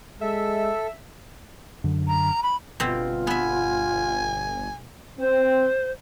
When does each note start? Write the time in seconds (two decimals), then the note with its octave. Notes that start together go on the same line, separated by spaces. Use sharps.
0.21 G#3 A4 E5
1.84 F#2 D3
2.07 A#5
2.43 B5
2.80 G1 B2 C4 F4
3.27 B3 E5 G#5
5.19 C4 C5